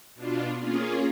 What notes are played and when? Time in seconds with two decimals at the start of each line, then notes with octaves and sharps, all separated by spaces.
0.15 B2 D4 F4
0.60 A#3 C#4 F4 G#4